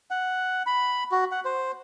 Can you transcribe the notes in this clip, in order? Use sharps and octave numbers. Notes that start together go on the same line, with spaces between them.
F#5
B5
F#4
F#5
C5